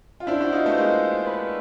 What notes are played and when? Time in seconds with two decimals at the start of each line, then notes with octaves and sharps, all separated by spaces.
0.20 F4
0.27 D4 E4 C5
0.41 E4 F#4
0.52 D#4 F4
0.65 A3 B3
0.78 G#3 A#3
1.29 B4